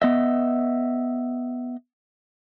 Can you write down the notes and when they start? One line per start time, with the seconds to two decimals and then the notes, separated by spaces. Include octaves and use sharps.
0.02 B3 D#5 E5